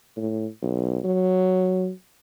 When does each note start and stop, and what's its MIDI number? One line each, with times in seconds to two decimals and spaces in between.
0.17 0.46 45
0.62 0.98 35
1.04 1.89 54